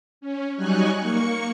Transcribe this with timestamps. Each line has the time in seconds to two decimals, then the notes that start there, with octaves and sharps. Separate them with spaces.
0.21 C#4
0.56 F#3 G3 D#4 G#5 C#6 F#6
1.00 A#3 C#6 C#7